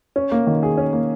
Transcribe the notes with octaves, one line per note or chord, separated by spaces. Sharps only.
C#4
A#3
D#3
G#4
C#4
A#3